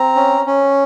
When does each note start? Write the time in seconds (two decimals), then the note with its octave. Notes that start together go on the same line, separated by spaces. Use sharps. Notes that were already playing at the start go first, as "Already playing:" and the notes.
Already playing: C4 A#5
0.16 C#4
0.46 C#4